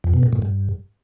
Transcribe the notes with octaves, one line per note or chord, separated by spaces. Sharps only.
F2
B2
A#2
A2
G2